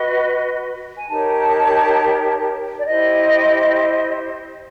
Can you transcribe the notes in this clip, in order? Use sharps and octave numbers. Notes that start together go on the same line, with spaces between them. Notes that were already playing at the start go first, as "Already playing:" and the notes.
Already playing: F#4 B4 D#5
G#5
D#4 G4 A#4 C#5 A5
D5
E4 G4 C5 D#5